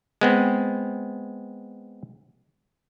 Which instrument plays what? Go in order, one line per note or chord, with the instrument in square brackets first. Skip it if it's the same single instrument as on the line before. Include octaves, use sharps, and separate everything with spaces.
[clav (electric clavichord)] G#3 B3 C4